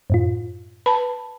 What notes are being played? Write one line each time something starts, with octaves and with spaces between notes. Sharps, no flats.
F#2 A2 F4
B4 A5 B5